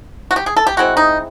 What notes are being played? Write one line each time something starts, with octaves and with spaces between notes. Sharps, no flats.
F#4
G4
G#4
A4
G4
E3 G#3 C4 F#4
D#4